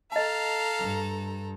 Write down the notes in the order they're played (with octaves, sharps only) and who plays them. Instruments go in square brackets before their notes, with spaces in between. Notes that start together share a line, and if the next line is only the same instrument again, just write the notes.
[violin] A4 A#5 [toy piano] D#5 A5 [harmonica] F5
[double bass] G2